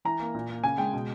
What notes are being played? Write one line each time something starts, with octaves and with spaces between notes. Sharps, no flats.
E3 A#5
A#3
A#2
A#3
C#3 G#5
G#3 G5
B2